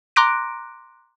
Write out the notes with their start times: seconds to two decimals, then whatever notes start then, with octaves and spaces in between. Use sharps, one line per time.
0.16 A#5 C6 D6 F#6 A#6 D7